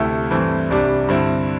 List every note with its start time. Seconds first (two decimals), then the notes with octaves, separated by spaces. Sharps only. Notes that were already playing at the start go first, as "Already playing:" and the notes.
Already playing: D2 C3 A3 E4
0.31 G2 E3 A3 C4
0.69 C2 C3 G3 D4
1.08 G2 D3 C4 E4